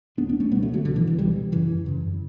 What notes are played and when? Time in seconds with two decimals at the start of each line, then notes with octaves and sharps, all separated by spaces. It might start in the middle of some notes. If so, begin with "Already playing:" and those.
0.17 B2 B3 D4
0.21 C#2
0.29 B3 D4
0.40 A3 C#4
0.51 B2 G3 B3
0.56 C#2
0.63 F#3 A3
0.73 D3 F#3
0.85 C#2 B2 D3
0.96 E3
1.07 E3
1.18 C#2 B2 E3 G3
1.52 F#2 C#3 E3
1.86 F#2 C#3